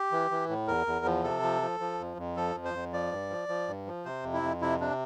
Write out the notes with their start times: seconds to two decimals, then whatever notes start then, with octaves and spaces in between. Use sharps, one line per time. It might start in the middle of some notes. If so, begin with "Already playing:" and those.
Already playing: G4
0.12 E3
0.31 E3
0.49 A2
0.68 E2 A#4
0.87 E2
1.05 F3
1.24 C3 A4
1.42 F3
1.62 F3
1.80 F3
1.99 F2
2.17 F2
2.36 F3 A4
2.55 F2
2.65 C5
2.74 F2
2.93 F3 D5
3.12 G2
3.30 F3
3.49 F3
3.68 G2
3.87 F3
4.05 C3 C5
4.24 F2
4.33 E4
4.43 F2
4.61 C3 E4
4.80 C3 D4